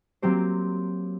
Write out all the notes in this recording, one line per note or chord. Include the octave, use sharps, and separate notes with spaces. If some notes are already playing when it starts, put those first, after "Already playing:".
F#3 A#3 C4 G4 C5